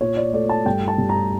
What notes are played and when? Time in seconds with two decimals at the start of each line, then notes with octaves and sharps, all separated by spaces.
0.01 A#2 C#5
0.17 D5
0.33 A3 D5
0.49 A5
0.66 G2 G5
0.88 A5
0.98 G2
1.09 A#5